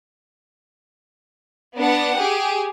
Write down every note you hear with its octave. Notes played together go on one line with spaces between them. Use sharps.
B3 D4 F#5
G4 G#4